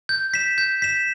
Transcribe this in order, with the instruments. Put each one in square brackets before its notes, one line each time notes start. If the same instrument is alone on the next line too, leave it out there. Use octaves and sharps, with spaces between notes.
[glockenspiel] G6
B6 E7
G6
B6 E7